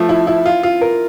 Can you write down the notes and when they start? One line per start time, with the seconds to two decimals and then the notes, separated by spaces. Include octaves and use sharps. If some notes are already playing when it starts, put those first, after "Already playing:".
Already playing: F3 A3
0.09 E4
0.27 E4
0.46 F4
0.63 F4
0.81 A#4